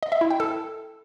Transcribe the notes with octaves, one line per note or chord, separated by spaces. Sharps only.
D#5
E5
E4
G5
A4